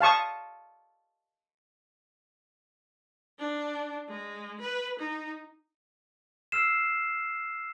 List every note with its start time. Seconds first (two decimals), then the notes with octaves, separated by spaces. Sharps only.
0.01 F5 A5 C#6 D#6
3.39 D4
4.08 G#3
4.60 B4
4.99 D#4
6.52 E6 F6 C7 E7